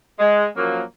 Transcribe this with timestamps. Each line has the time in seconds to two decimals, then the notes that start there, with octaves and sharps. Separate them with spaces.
0.19 G#3
0.56 F#2 F3 F#3 A#3